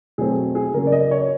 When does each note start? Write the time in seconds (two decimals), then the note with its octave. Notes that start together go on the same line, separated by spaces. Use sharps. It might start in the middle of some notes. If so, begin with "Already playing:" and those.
0.18 B2 F#3 A3 C4 G#4
0.55 G#4
0.74 C#3 F#3 A#3 C#4 A#4
0.87 D5
0.92 D#5
1.11 C#5